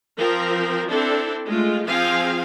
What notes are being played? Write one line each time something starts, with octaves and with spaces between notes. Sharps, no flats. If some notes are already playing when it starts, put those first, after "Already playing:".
F3 C4 A#4
C4 D4 E4 A4
G#3 A3 F4
F3 C4 F4 G#4 F5 G#5